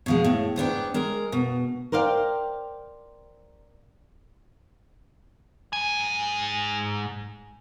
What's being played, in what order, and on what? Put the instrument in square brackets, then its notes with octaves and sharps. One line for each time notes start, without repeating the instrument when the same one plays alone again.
[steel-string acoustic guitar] B2 F3 G#3
A2
G#2 B3 D4 G5
G#3 A#4
B2
[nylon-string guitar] A#4 C5 D5 F5 G5
[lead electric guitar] G#2 G#5